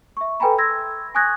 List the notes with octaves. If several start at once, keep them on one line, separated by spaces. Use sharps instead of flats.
E5 C#6
A4 B4 G5 G#5 A#5 B5
C6 E6 G#6 A#6
G#5 C#6 D#6 F#6 G#6 A#6